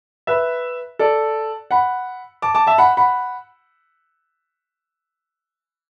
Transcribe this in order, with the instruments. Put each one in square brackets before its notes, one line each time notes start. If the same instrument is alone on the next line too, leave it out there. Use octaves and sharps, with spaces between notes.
[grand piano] B4 E5
A4 D5
F#5 B5
A5 D6
A5 D6
E5 A5
F#5 B5
F#5 B5